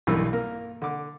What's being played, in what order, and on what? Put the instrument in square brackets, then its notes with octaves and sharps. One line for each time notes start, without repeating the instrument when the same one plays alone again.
[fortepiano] B1 G2 D#3 E3
A#3 A#4
D3 D6